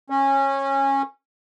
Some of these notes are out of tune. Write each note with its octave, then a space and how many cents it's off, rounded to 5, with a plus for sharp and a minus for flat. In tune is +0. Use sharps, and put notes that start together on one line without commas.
C#4 -20